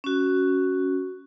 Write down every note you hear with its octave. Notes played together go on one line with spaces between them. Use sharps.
C#4 F#4